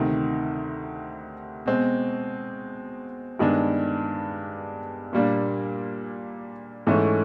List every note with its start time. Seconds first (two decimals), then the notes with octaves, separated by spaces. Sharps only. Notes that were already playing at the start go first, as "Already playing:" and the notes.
Already playing: D2 C3 D#3
1.66 B2 G#3 C4
3.39 G2 D#3 G#3 B3 D4
5.13 A#2 G3 A#3 D4
6.87 G#2 E3 A3 C#4